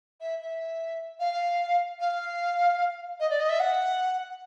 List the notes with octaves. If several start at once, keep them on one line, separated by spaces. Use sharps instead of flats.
E5
E5
F5
F5
D#5
D5
D#5
E5
F#5